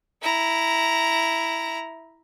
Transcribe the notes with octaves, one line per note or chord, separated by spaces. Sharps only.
E4 A#5